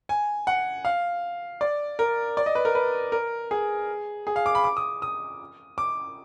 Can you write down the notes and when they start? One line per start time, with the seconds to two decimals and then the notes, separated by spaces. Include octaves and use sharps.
0.09 G#5
0.47 F#5
0.85 F5
1.61 D5
1.99 A#4
2.37 D5
2.46 D#5
2.55 B4
2.65 A#4
2.75 B4
3.12 A#4
3.51 G#4
4.27 G#4
4.36 F5
4.46 D6
4.55 B5
4.64 D6
4.77 D#6
5.02 D#6
5.78 D6